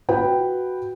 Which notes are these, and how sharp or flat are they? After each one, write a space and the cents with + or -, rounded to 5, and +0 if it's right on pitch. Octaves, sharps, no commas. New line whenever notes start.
F#4 +0 B4 +0 G5 +0